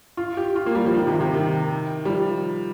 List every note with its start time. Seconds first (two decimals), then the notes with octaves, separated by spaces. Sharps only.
0.17 F4
0.37 G4
0.56 F4
0.66 A#3
0.75 G3
0.85 F3
0.94 D#3
1.07 C3
1.21 C3
1.33 D#3
2.05 G3
2.09 F3